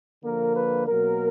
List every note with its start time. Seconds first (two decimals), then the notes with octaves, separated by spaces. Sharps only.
0.24 D3 F3 A#3 A#4
0.56 B4
0.88 B2 F#3 A#3 A#4